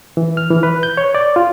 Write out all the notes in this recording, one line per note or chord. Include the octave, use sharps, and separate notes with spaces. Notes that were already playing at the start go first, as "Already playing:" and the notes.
E3
F6
E3
B4
G6
C#5
D5
F4